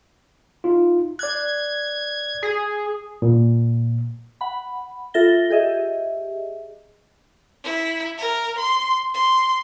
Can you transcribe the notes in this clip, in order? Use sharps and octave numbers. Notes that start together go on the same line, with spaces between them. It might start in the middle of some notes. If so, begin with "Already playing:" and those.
D#4 F4
D5 F#6 G#6
G#4
A#2
F#5 B5
F4 A4 E5 A6 A#6 G7
G4 G#4 D#5 E5
E4
A#4
C6
C6